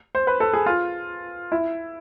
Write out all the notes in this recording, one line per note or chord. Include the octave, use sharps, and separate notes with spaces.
C5
B4
A4
G#4
F4
E4